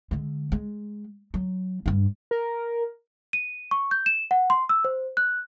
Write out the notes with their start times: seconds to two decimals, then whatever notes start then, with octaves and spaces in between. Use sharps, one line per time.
0.11 D3 G#3
0.52 G#3
1.34 F#3
1.86 G2 D4
2.31 A#4
3.33 D#7
3.71 C#6
3.91 G6
4.06 E7
4.31 F#5
4.50 C6
4.69 E6
4.85 C5
5.17 F#6